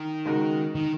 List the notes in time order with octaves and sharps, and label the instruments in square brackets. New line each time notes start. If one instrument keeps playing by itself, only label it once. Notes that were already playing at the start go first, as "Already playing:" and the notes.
Already playing: [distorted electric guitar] D#3
[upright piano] C#3 G#3 D#4 F#4 A#4
[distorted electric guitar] D#3